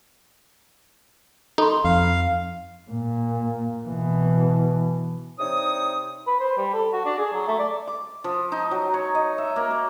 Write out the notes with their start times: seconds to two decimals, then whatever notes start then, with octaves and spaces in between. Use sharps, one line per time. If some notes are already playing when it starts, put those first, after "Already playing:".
1.58 D#4 A4 B5 C6
1.84 F2 F5
2.91 A#2
3.87 B2 E3
5.40 C3 D4 D#4 C#5 D#6
6.27 B4
6.40 C5
6.57 G3
6.73 A4
6.93 F#4
7.05 D4
7.19 G#4
7.33 F#3
7.48 A3
7.59 D5
7.87 D6
8.24 F3
8.52 D#4
8.71 F#3
8.94 C#5
9.15 D#5
9.38 E5
9.56 A#3
9.71 D6